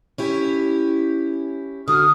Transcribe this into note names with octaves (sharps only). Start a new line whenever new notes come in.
C#4 E4 G4
D3 F#4 D#6 F6